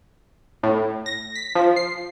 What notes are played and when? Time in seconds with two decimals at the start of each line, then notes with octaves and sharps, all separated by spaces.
0.63 A2
1.06 A#6
1.35 B6
1.55 F3
1.76 C7